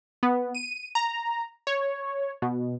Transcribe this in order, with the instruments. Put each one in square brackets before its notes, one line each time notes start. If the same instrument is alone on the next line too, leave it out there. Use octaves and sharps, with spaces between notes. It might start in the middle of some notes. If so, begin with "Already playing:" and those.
[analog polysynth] B3
D#7
A#5
C#5
B2